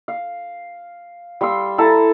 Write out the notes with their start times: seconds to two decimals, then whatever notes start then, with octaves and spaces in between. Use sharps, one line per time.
0.08 F5
1.41 G3 F5 C6 E6
1.78 E4 A4 A5 A#5